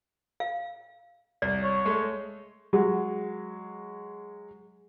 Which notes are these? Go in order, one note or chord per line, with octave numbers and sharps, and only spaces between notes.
F5
C2 D5
C#5
G#3 A3
F#3 G#3